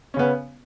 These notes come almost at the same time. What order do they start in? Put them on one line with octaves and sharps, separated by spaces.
C#4 C#3 B3